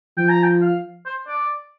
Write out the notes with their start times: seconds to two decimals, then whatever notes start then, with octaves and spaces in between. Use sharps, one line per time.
0.17 F3 G5
0.29 A#5
0.43 G5
0.62 F5
1.06 C5
1.28 D5